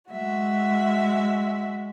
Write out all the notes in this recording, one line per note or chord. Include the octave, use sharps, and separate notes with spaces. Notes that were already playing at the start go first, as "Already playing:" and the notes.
G#3 F#4 E5